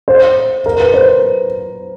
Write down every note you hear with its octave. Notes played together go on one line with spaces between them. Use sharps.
C5
A#4
B4
C5